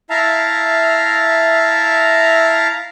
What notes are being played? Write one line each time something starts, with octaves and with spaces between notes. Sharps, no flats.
E4 E5 F5 A5 A#5